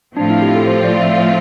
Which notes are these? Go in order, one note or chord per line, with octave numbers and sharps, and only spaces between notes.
A2 F3 C4 D4 F4
E4
G4
A4
C5
D5
E5
F5